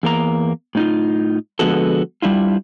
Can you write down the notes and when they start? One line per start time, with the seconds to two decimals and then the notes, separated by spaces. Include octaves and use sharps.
0.03 E2 A#3 A#5
0.75 A2 D#4 F4
1.59 D3 F3 G#3 B3 F#4 A4
2.22 G3 D4 E4 F4